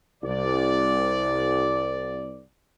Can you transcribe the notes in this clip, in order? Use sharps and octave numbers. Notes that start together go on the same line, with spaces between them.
C2 D5